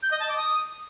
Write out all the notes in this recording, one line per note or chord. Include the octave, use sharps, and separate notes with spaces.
G6
D#5
A5
D6
D#6